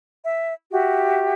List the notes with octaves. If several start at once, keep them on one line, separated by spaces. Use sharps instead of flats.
E5
F#4 G4 E5